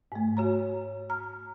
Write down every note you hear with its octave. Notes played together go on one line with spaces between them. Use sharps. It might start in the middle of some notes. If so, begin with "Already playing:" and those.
G#2 A3
F#4 C#5 A#5
A#5 F6